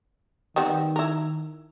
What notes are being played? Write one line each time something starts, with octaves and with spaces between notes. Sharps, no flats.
D#3 G3 B3 C4
E4 A#4